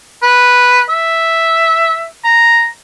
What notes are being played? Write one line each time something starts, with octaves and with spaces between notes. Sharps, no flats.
B4
E5
A#5